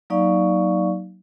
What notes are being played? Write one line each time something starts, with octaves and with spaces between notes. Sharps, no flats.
F#3 A#3 D#4 D5 F5 C#6